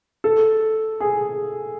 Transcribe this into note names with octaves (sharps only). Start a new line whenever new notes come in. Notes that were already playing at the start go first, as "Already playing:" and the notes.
A4
G#4